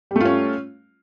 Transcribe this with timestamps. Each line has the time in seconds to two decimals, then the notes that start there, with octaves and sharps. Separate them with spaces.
0.11 G3
0.16 A3
0.20 F4
0.25 C#4